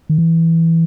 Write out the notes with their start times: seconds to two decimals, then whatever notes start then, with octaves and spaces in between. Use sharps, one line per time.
0.09 D#3
0.18 E3